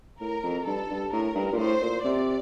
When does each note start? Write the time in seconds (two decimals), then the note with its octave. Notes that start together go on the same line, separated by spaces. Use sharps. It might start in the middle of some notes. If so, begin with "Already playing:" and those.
0.20 A2 A#4
0.43 F2
0.67 G2 A4
0.90 G2
1.13 A2 A#4
1.35 G2
1.53 A#2
1.58 A2 C5
1.82 A#2
2.04 C3 D5